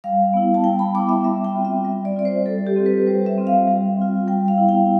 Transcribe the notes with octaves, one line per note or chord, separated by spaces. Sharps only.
G3 F5
B3 E4
A5
G3 G5
B5
B3 E4 D6
E5
G3 E5
G5
C4 F4
E5
G3 E5
D5
C4 F4 D5
C5
G3 A4
G4
C4 F4
B4
G3 C5
E5
C4 F4
F5
G3
C4 F4
G3 G5
F5
B3 E4
G5